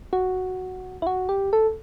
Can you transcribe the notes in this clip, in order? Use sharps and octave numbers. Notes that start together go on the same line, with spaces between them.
F#4
E4
F#4
G4
A4